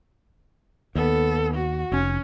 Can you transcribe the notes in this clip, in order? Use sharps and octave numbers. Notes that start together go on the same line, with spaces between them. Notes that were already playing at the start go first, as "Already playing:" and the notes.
D#2 B3 A4
F#4
F1 C#4